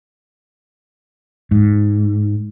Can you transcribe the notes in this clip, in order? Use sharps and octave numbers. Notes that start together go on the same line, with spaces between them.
G#2